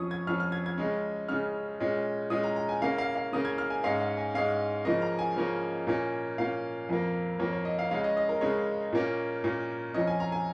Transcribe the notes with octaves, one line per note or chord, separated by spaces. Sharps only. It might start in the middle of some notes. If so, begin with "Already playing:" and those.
Already playing: F2 F3 C#4 C#6 D#6
G#6
F2 F3 C#4 F6
F6
G#6
G#6
C#3 G#3 C#4
C#3 G#3 C#4 F6
A#2 G#3 C#4
A#2 G#3 C#4 D#6
A#5
A#5
G#5
C#3 A#3 C#4 F5
F5
F5
C#3 A#3 C#4 D#6
G#6
F6
G#5
G#2 G#3 C#4 F5
F5
G#5
G#2 G#3 C#4 F5
C#3 F3 A#3 C#4 D#5
A#5
G#5
C#3 F3 A#3 C#4
A#2 A#3 C#4
A#2 A#3 C#4 F5
F2 F3 A#3
F2 F3 A#3 C#5
C#5
D#5
F5
C#3 G#3 C#4 F5
D#5
D#5
A#4
C#3 G#3 C#4 C#5
A#2 A#3 C#4
A#2 A#3 C#4
F2 F3 C#4 D#5
G#5
A#5
G#5